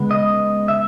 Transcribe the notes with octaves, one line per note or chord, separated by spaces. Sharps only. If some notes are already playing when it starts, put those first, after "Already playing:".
Already playing: C#3 G#3 B3
D#5
E5